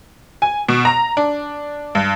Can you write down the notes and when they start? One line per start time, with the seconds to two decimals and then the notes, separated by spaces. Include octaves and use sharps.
0.42 G#5
0.69 B2
0.85 A#5
1.17 D4
1.95 G2